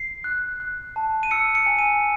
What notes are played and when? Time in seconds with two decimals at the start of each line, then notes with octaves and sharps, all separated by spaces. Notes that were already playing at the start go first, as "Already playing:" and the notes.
Already playing: C7
0.24 F#6
0.60 F#6
0.96 A5
1.23 D#7
1.31 E6 C#7
1.55 C#7
1.66 G#5
1.79 D#7